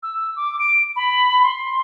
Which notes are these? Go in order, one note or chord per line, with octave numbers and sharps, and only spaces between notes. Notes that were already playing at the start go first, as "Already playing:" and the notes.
E6
D6
D7
B5
C6